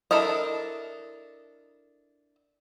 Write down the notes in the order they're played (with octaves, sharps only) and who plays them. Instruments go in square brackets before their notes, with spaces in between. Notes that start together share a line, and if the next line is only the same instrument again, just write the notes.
[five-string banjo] D4 E4 A4 A#4 D#5